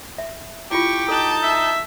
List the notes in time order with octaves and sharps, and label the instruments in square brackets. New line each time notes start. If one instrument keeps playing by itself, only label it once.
[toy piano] E5
[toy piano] E4 F4 [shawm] G4 [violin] C#6
[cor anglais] D#4 [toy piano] A4 [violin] A5 G6
[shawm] E5